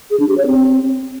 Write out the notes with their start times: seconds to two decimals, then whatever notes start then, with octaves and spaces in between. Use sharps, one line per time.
0.11 G#4
0.20 D4
0.29 G4
0.38 C#5
0.47 C4